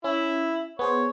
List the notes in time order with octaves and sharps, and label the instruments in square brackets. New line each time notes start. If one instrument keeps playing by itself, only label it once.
[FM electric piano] C#4 [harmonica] E4
[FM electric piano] B3 G#4 C5 [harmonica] C#5